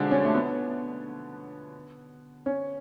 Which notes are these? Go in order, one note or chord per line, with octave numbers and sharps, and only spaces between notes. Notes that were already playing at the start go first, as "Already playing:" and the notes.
Already playing: B2 D3 F3 G#3 D4
C#4
A3
B3
C#4